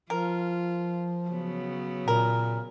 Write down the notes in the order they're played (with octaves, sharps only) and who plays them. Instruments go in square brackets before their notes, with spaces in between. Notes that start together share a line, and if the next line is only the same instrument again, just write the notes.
[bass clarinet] F3 [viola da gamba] F4 [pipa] A#4
[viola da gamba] C#3 F#3 B3
[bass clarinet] A#2 [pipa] A#4